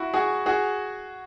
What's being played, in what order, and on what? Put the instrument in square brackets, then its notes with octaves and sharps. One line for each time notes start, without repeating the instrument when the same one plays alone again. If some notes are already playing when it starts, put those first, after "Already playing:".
Already playing: [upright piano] E4 F#4
F#4 G#4
F#4 G#4